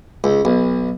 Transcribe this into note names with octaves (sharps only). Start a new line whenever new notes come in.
C#2
B1